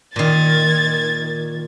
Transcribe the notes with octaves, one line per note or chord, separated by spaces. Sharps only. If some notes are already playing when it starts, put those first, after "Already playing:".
A#2 D#3 G#6 A6